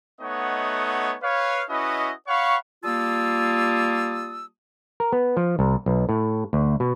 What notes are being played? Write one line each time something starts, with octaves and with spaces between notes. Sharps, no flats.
A3 B3 D#4 C#5 D#5 F#5
B4 C#5 F5
C#4 E4 F#4 B4 D#5
C#5 F5 F#5 B5 C#6
G3 A#3 F4 A5 D#6 E6
A#4
B3
F3
C2
B1
A2
D2
B2